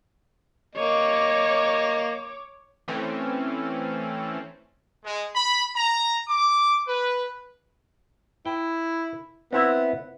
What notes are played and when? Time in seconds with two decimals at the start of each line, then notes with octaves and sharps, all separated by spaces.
0.75 A#3 C#5 D#5 D6
2.88 E3 A3 C4 C#4
5.04 G#3
5.35 B5
5.76 A#5
6.28 D6
6.87 B4
8.46 E4 G5
9.53 B3 C4 E4 E5